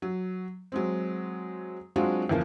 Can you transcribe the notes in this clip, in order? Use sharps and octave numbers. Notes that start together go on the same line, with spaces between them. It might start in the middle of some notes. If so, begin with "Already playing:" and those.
F#3
F#3 G#3 C4
F#3 G#3 C4 D4 F4 F#4
E2 C#3 F3 A#3